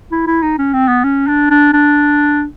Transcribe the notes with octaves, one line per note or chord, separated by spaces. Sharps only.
E4
E4
D#4
C#4
C4
B3
C#4
D4
D4
D4